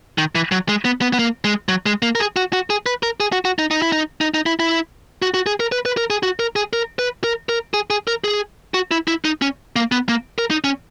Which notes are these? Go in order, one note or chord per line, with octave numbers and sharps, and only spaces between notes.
D#3
E3
F#3
G#3
B3
B3
B3
A#3
G#3
F#3
G#3
A#3
A#4
G#4
F#4
F#4
G#4
B4
A#4
G#4
F#4
F#4
D#4
D#4
E4
D#4
D#4
D#4
E4
E4
F#4
F#4
G#4
A#4
B4
B4
A#4
G#4
F#4
A#4
G#4
A#4
B4
A#4
A#4
G#4
G#4
A#4
G#4
F#4
E4
E4
D#4
C#4
A#3
B3
A#3
A#4
D#4
C#4